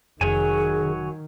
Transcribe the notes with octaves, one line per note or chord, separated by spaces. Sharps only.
F1 D#3 F#3 G#4 C#5 G#5